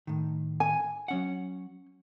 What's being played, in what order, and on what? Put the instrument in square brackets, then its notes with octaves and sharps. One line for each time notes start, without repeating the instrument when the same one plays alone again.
[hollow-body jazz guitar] A2 D#3
[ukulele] G#5
[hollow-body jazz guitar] F#3 C#4 F#5